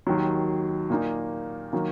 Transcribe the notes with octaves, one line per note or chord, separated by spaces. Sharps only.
D#2 D#3 F#3
A#2 A#3 D#4
D#3 F#3 A#3